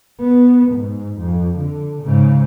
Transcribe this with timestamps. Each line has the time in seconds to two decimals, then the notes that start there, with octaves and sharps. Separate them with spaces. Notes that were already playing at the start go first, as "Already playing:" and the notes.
0.21 B3
0.73 G#2
1.20 F2
1.58 D3
2.03 G#2 C#3